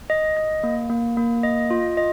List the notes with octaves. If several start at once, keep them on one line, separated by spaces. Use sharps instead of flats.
D#5
D#5
A#3
A#3
A#3
D#5
F4
D#5